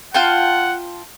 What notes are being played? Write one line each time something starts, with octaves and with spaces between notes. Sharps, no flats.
F4 F#5 G5 A5